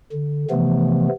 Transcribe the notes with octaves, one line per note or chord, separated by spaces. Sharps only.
D3
C3 E3 F3 A3 B3